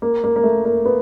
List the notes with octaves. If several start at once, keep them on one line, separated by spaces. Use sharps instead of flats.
A#3
A#3
A#3
A3
A#3
B3